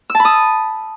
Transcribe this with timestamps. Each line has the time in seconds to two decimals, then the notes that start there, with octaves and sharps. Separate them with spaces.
0.10 E6
0.15 A5
0.20 B5
0.25 D#6